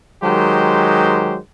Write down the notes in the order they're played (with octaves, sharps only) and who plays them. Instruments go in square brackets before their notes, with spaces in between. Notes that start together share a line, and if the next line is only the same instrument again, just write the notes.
[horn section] D#3 F#3 G#3 G4 C5